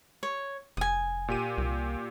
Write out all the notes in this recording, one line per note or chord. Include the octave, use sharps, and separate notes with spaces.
C#5
F1 G#5 D#6
A#2 G4 D#7
C2